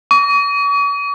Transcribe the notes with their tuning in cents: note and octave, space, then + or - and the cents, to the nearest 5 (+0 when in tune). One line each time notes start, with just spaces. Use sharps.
C#6 +45